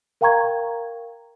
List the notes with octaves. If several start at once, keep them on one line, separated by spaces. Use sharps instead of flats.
A#4 F5 G5 A#5 C#6 G#6